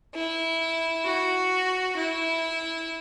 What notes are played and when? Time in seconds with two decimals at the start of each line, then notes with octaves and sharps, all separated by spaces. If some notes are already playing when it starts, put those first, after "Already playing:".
0.15 E4
1.05 F#4
1.97 E4